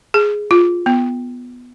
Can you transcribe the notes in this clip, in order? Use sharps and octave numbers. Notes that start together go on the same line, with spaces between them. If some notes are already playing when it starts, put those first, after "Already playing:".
G#4
F4
B3